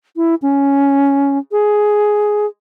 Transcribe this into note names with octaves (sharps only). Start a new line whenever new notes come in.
E4
C#4
G#4